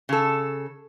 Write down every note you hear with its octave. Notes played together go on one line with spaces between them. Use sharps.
C#3 A4